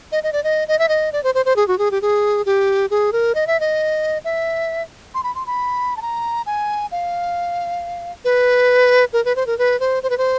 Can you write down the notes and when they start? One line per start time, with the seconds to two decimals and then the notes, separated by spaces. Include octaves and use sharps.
0.12 D#5
0.23 D#5
0.33 D5
0.44 D#5
0.68 D#5
0.79 E5
0.89 D#5
1.13 D5
1.24 C5
1.35 C5
1.46 C5
1.56 G#4
1.68 F#4
1.79 G#4
1.91 G4
2.02 G#4
2.46 G4
2.90 G#4
3.12 A#4
3.35 D#5
3.47 E5
3.60 D#5
4.24 E5
5.14 C6
5.24 B5
5.35 C6
5.47 B5
5.97 A5
6.02 A#5
6.46 G#5
6.92 F5
8.25 B4
9.13 A#4
9.25 B4
9.36 C5
9.47 A#4
9.58 B4
9.80 C5
10.03 C5
10.10 B4
10.18 C5